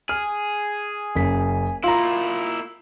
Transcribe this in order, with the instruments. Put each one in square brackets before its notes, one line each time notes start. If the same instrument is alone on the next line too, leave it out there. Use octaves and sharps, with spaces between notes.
[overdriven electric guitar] G#4 [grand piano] F6
[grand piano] F#1 B6
[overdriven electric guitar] A#3 E4 [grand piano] F4 A#5